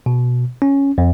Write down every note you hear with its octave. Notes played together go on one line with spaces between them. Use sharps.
B2
C#4
F2